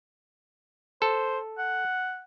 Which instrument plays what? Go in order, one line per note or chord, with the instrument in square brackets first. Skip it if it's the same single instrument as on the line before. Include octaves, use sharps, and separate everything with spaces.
[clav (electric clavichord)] A4 [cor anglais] C5
[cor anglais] F#5